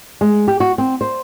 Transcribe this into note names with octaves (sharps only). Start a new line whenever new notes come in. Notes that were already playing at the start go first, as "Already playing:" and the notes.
G#3
G4
F#4
C4
C5